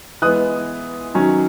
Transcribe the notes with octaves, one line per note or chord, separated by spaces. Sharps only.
E3 G#3 B3 D#6 F#6
D#3 F#3 C#4